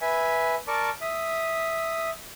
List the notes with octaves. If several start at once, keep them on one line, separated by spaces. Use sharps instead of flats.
B4 E5 G#5
A#4 D5 A5 C#6 D6
E5 D#6